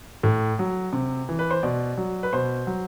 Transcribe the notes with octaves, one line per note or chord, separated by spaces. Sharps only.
A2
F#3
C3
E3
B4
C5
B2 D5
F#3
B4
B2 C5
F#3